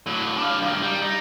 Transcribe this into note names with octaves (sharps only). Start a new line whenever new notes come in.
A2 F#3
D4 F5
G2 D#3
G3
D#4